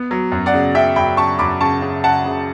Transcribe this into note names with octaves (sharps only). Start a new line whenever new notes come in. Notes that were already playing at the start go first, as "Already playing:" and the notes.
Already playing: B3
F#3
F#2
D5 F#5
C#3
C#3 E5 G5
F#2 G5 B5
C#3 A5 C#6
F#2 B5 D6
C#3 A5 C#6
C#3
C#3 F#5 A5
C#3